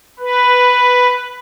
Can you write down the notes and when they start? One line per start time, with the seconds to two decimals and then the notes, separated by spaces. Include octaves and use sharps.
0.19 B4